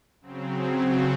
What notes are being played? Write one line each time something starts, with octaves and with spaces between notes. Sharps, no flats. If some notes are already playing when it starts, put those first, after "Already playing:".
C#3 F#3 C4